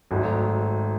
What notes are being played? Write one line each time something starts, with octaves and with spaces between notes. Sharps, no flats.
G#1 G#2 F#3 A3